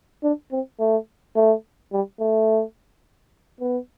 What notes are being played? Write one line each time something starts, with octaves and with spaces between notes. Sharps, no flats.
D4
C4
A3
A3
G3
A3
B3